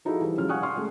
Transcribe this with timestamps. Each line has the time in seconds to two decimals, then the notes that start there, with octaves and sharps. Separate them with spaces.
0.05 F3 D#4 E4 F#4 G#4 A4
0.21 E3 G3
0.37 C#3 F#3 G#3 F4 F6
0.49 F5 F#5 G#5 C#6 D#6 F#6
0.63 C6 C#6 F6
0.76 C#3 G#3 A3